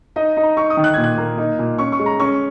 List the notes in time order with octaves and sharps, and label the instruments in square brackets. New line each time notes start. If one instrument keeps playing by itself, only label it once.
[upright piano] D#4 D#5
D#4
A#5
D#4 C#6
D#6
D#3
F#6
A#2 G#6
F#6
A#3
D#4
A#2
C#4 C#6
C#6
G#3
A#5
C#4 C#6